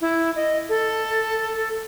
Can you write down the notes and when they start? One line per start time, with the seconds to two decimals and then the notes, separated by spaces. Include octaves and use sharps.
0.01 E4
0.36 D#5
0.69 A4